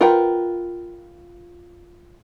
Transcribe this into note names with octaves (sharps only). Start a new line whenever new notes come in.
F4 A#4 B4 F#5 G5